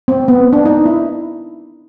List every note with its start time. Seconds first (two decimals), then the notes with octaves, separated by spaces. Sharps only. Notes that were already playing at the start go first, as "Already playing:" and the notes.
0.08 C4
0.28 B3
0.53 D4
0.66 D#4
0.86 E4